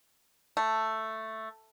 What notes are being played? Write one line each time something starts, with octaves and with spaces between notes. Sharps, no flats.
A3